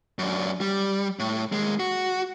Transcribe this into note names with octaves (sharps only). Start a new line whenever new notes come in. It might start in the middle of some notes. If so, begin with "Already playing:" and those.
F#2 D4
G3
A2
D#2 G#3
F#4